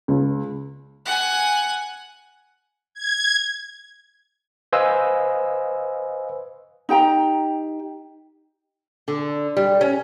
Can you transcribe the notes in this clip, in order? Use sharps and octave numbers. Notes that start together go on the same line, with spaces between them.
C#2
F#5 G#5
G#6
B4 C5 D#5 F5 G#5 E6
D#4 G4 G5 A#5
D3
G3
C#4